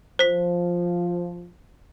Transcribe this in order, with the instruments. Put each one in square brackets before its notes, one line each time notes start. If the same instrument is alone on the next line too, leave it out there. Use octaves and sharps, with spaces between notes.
[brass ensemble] F3 [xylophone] C5 B6